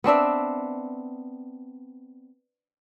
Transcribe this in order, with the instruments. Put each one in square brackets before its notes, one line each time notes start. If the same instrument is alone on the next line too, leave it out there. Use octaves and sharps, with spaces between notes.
[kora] B3 C4 D4 E5